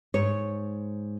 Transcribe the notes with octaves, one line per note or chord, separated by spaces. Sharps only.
G#2 C#5